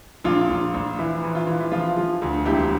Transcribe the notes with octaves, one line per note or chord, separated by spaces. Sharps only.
A#1 F4
A#1
A#1
E3 E4
E3
F4
E3
E4
F3 F4
F3
D2
E1 E4 G4